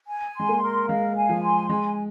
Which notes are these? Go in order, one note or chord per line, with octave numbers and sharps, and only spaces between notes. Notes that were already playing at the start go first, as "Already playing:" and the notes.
G#5
G#3 C6
A#3
A#4
G#3 F5
G#5
F3
C6
G#3 G#5